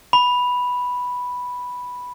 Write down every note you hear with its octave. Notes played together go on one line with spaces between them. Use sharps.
B5